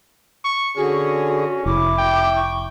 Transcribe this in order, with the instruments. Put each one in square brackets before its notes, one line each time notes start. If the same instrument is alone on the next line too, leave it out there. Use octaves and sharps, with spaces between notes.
[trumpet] C#6
[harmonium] D3 G#4 [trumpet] C#4 [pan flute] F#4
[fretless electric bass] F1 [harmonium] E4 [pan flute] D6
[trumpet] G5
[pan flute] C#6